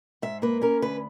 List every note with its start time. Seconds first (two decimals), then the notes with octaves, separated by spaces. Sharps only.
0.22 G#2 E5
0.42 A#3 B4
0.62 C#4 A#4
0.82 D2 B4